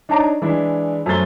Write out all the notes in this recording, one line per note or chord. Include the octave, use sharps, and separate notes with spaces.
D4 D#4 C#5 A5 A#5 D6
E3 G#3 D4 E4
F#2 F#3 A3 C5 A6 G7